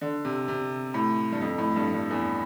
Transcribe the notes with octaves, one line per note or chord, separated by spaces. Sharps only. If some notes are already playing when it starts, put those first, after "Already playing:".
D3
C3
C3
A2
G2
F2
A2
G2
G2
E2